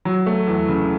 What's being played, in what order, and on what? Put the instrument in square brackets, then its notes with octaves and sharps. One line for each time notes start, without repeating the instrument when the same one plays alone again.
[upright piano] F#3
A3
E2
C#3